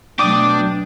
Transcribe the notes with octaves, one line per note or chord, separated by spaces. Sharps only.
B2 F#3 A3 D4 G5 D6 D#6